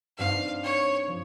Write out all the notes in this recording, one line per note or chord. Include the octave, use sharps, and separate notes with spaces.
G2 G3 C4 D#4 F5
C#5
F3